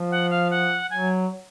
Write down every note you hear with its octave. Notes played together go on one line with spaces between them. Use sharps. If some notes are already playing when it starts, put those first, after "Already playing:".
Already playing: F3
F#5
F5
F#5
F#3 G#5